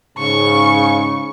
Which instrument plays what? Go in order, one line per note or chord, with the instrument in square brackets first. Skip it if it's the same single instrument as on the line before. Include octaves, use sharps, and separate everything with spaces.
[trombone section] G#2 C#3 [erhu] C#6